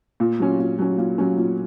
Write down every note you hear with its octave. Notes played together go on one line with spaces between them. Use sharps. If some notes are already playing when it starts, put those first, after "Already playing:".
A#2
F#3 C#4
A#2
F#3 C#4
A#2
F#3 C#4
A#2